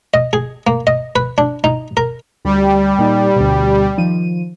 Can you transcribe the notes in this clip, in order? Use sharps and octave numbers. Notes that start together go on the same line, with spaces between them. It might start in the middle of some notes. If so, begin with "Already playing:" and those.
D#5
G#4
A#3
D#5
B4
D4
D#4
A#4
D2 G3
A#2 D#4
D2 B2
D#3 F3 D#7